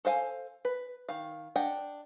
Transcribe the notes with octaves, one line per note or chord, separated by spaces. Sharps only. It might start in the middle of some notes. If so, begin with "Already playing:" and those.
A4 C5 F5 G5 G#5
B4
D#3 F5
D4 D#5 F#5 G5